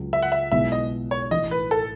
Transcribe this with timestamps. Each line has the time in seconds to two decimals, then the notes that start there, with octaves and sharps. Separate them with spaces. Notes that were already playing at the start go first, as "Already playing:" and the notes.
Already playing: C#2 C#3 F#3
0.13 E5
0.22 F#5
0.32 E5
0.52 B1 B2 G#3 B3 E4 E5
0.72 D#5
1.11 C#5
1.31 A1 A2 E3 D#5
1.51 B4
1.71 A4